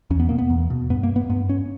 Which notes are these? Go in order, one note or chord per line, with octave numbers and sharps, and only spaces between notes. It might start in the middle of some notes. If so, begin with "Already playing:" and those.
E2 C#4
B3
B2 A#3
B3
E2
B2
G2 B3
A#3
B3
G2 B3
C#4